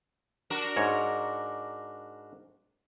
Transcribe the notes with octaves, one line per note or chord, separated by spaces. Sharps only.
D4 F#4 A#4
G#2 C#5